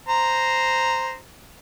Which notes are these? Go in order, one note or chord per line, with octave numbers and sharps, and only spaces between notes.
C5 A#5